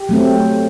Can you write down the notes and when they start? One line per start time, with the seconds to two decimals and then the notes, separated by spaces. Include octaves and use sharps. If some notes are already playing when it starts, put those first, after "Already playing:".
Already playing: G4
0.09 F#3 A3 C4